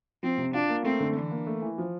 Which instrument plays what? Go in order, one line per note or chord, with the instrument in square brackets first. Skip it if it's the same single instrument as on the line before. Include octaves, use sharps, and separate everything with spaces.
[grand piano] F3 [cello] C4
[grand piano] C3
[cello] D4 [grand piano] F4
[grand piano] A#3
[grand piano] A3 [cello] C4
[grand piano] D3
[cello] E3 [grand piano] D4
[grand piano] A#3
A3
E3
F3